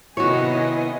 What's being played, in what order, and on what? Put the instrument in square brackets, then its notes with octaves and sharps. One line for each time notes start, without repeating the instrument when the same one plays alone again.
[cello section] C3 D#3 B3 [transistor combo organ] E4 [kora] F#4 C#5 [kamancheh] D#5 G#5